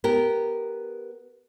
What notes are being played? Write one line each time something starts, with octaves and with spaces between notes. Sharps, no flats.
B3 G4 A#4